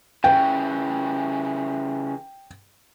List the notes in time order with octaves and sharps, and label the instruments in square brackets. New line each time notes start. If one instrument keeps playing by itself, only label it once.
[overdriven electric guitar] C#3 E3 [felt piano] G5